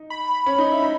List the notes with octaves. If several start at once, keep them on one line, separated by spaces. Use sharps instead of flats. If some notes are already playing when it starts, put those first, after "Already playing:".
Already playing: D#4
B5
C#4
D#4
E4
D#4